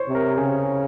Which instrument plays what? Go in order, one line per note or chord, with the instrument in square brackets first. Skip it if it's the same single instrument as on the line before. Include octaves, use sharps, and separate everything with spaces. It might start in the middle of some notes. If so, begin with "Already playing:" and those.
Already playing: [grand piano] C5 C#5
[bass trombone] C3
[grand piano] A#4
[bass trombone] C#3 [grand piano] G#4